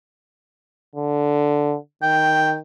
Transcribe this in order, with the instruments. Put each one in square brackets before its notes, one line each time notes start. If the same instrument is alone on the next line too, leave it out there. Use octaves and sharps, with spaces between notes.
[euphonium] D3
[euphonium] D#3 [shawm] G5